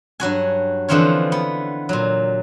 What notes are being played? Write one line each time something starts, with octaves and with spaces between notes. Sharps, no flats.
G2 F#3 F#4 G#5
D3 E3 F3 C4 F4 C#5
B3
A#2 F#3